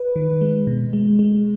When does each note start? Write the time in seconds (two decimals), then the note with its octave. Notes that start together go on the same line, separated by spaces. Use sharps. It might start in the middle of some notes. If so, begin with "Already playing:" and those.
Already playing: B4
0.16 D#3
0.41 G#3
0.67 B2
0.93 G#3
1.19 G#3